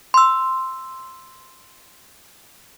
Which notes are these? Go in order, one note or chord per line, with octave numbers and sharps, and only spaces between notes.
C6 E6